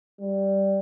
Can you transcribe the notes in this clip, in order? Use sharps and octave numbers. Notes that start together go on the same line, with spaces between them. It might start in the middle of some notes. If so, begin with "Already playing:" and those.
G3